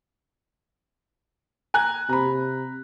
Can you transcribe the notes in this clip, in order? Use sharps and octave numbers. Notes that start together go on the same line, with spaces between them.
G#5 A#5 F#6
C3 A#5 B5